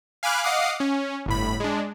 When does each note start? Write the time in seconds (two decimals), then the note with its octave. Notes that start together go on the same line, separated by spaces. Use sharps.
0.23 F5 G#5 B5 D6 F6 F#6
0.43 D#5 F5 F#5 D6 D#6 C7
0.80 C#4
1.26 G1 A2 B5
1.60 G#3 D4